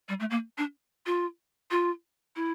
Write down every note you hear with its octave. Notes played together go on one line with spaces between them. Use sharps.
G3
A3
A#3
D4
F4
F4
E4